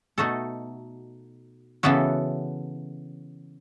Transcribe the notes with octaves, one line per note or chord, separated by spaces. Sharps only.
B2 A3 D#4 F#4 A4
C#3 E3 B3 F#4 A4